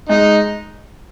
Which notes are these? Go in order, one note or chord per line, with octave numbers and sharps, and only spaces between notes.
G#3 D#4